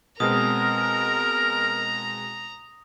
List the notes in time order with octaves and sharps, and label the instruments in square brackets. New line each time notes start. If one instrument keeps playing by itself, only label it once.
[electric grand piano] B2 G#3 C4 [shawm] A#4 [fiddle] A#5 [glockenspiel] D#6